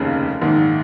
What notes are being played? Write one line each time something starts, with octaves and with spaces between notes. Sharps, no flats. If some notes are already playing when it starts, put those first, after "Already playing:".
Already playing: F1 D#2 C#3 F5
A#1 G#2 D#3